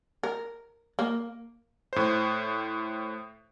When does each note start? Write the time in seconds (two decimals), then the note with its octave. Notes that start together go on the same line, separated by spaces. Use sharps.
0.23 A#4
0.99 A#3
1.93 A2 C5